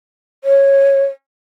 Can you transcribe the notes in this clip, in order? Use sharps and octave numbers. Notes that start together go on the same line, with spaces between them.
C#5